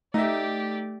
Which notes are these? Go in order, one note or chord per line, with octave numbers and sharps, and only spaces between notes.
A3 D#4 G4 D5 E5